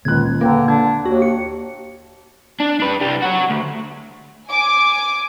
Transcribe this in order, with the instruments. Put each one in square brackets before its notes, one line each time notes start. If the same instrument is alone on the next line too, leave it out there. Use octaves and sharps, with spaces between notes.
[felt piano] D#1 F#6 [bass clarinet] C#2 [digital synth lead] G#6
[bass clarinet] D3 [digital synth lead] A#3 [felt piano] B4 G5 A#5
[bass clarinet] D4 [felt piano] G#6
[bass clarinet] D#2 [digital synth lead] F#4
[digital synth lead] C#7
[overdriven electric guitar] D4
D4 B4
C2 G3
F#4 C#5
D2
[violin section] G#5 D6